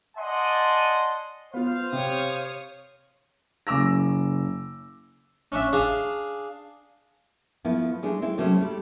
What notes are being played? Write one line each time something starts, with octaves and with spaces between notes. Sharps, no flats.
D5 D#5 F#5 G#5 A5 C6
B3 F4 C5 F5
C3 C#5 D#6
F#1 C#4 D6 E6 A#6
C#4 D4 E5
D4 G#4 F5
F3 A3 B3 E4
G#3 A3 D4
C4 E4
C3 F#3 A3 A#3 C4 C#4
G3 A3